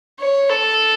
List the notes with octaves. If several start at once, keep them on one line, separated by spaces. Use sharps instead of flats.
C#5
A4